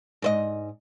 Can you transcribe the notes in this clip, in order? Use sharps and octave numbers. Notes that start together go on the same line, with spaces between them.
G#2 C5 D#5